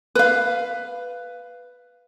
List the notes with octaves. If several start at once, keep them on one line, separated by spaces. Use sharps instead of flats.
B4 F5